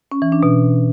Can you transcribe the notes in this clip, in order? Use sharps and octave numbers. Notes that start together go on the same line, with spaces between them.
C#4
E3
D4
B2